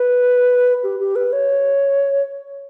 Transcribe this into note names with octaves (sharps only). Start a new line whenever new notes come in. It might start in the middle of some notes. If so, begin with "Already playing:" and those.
Already playing: B4
G4
G4
B4
C#5